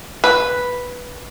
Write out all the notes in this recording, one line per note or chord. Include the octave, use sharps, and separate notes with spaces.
B4